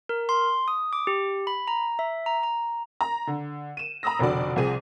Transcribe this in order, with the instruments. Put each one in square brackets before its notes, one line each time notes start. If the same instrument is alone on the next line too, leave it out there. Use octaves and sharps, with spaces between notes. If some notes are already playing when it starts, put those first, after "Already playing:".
[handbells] A#4
C6
D#6
D6
G4
B5
A#5
E5
A#5
A#5
[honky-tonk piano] A#5
D3
D#7 E7
A#5 B5 D#6 E6 A#6
F1 B2 D3 F#4 D5
C2 F3 C4 G#4 D#7